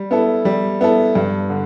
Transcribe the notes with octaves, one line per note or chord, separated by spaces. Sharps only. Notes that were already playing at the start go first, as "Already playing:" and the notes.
Already playing: G3
B3 E4 A4
G3
B3 E4 A4
G2
D3